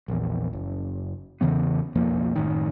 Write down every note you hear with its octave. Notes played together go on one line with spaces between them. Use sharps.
A#1 E2
F#1
E2 C#3 E3 B3
B1 F2 F3 A#3
F#1 A2 D#3